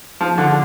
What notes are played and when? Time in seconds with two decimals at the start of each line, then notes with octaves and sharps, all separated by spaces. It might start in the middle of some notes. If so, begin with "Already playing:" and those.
0.20 F3
0.38 D3